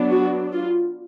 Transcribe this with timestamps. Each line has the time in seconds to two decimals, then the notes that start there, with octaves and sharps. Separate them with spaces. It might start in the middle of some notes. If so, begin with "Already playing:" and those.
Already playing: F#3 B3 D4
0.12 F#4
0.52 F4